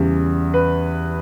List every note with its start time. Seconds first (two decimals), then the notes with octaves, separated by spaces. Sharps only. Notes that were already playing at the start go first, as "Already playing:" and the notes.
Already playing: E2 C#3 G3
0.54 B4